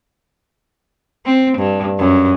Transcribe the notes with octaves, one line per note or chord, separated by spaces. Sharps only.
C4
G2
F#2